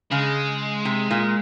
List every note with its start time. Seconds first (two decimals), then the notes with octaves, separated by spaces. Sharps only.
0.11 C#3 G#3
0.85 C3
1.11 A#2